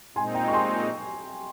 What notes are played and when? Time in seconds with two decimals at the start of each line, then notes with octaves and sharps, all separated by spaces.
0.16 A#2 G#3 C4 D#4 G#5 C6
0.34 G5 A#5
0.48 C#6
0.53 G#5 C6